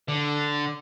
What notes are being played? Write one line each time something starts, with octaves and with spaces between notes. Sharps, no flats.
D3